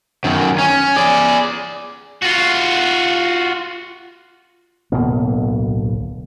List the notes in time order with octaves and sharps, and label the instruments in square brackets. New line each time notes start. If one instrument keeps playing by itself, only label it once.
[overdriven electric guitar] F#2 D#3
C#4
G#4 D5
[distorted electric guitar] F4 F#4
[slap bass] D1 B1 B2 A#3